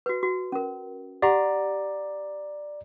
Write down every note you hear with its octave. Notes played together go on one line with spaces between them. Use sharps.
F#4 B4
F#4
C#4 A#4
G4 D5 F#5 A#5